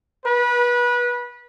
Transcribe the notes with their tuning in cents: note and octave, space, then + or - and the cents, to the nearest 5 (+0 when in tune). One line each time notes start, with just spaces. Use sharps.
B4 -25